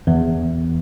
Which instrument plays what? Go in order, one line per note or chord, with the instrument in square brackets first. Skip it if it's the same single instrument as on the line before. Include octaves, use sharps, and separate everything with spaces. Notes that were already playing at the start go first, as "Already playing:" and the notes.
[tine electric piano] E2